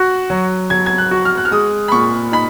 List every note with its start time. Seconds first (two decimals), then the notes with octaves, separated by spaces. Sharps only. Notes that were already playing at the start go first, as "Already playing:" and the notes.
Already playing: F#4 F#6
0.30 F#3
0.70 F#3 G#6
0.86 G#6
0.98 F#6
1.11 F#4
1.25 F6
1.38 F#6
1.45 F6
1.51 G#3 D#6
1.88 B5
1.92 A#2 C#6
2.32 D#4 B5